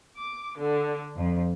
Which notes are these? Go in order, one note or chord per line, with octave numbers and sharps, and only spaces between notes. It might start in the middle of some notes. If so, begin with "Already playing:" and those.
D6
D3
F2